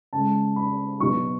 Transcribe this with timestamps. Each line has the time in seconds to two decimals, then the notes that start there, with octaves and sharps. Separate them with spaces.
0.13 C#3 G#3 A5
0.56 B5
1.00 B2 F#3 C#6